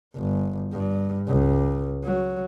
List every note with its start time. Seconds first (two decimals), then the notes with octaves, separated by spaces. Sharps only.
0.16 G1
0.73 G2
1.28 C#2
2.05 F#3